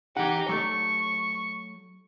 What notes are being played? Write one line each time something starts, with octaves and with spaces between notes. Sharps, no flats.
E3 D#4 G4 F#5
F#3 A3 D5 C#6